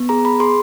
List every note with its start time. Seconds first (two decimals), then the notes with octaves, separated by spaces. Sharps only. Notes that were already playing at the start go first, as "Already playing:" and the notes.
Already playing: B3
0.09 G#4 A#5
0.25 B5
0.40 G#4 C6